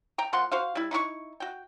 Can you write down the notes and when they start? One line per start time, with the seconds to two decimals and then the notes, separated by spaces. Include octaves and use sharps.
0.18 G5 A#5
0.33 F3 A#3 F#5 C6
0.52 F#4 C5 F5
0.75 G3 E4
0.91 D#4 E4 F#4 C#6
1.40 F#4 G5